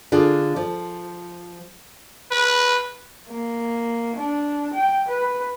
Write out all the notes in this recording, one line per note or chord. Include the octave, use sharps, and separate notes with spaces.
D3 D4 F4 G#4
F3
B4
A#3
D4
G5
B4